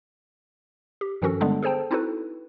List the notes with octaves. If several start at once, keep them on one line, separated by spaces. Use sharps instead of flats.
G4
G2 D#3 F3 C#4 F#4 A4
D3 G3 G#3 B3 D4
G#4 A4 C5 G5 A5
C4 D#4 E4 F#4 A4 B4